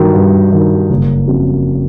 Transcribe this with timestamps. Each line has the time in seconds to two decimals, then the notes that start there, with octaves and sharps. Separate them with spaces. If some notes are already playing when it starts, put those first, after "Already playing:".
Already playing: G2 D#3 F#3
0.14 G2
0.52 D#3 F#3
0.90 F#1
1.28 F2 C#3 F#3